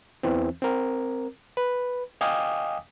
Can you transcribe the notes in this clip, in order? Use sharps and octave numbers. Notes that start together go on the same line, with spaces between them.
E2 E3 C4
C4 A#4
B4
D#5 F5 G5 G#5 D6 D#6